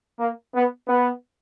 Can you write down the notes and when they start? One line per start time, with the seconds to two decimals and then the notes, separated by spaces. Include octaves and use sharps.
0.19 A#3
0.53 B3
0.88 B3